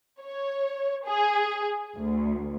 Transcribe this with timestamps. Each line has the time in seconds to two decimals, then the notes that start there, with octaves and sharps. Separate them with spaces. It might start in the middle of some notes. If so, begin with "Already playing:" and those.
0.21 C#5
1.06 G#4
1.96 D2